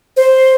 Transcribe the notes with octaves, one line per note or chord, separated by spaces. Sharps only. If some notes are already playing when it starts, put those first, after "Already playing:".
C5